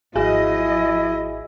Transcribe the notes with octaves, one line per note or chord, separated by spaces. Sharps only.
G#1 F3 E4 F#4 G#4 D#5 G#5